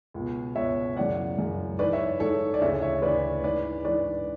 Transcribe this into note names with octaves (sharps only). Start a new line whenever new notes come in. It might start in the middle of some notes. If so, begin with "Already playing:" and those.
C#2 B2
C#2 B2 C#5 E5
F#2 C#3 E3 D5 F#5
F#2 C#3 E3
G#2 E3 B4 D5
C#5 E5
G#2 E3 A4 C#5
D5
D2 C#3 E3 C#5 E5
C#5 E5
D2 C#3 E3 B4 D5
G#2 E3 B4 D5
G#2 E3 B4 D5